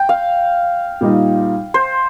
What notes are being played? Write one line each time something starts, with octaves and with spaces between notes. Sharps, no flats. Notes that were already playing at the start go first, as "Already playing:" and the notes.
Already playing: G5
F5
A#2 G3 D#4
C5